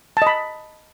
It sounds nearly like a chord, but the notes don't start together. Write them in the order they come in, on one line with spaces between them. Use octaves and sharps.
A5 D#5 B5